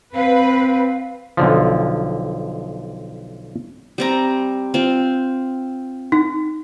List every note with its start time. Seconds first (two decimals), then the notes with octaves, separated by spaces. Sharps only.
0.15 C4 B4 F5
1.37 B1 D3 F3
3.98 G3 C4 A#5
4.74 C4 F4
6.12 D#4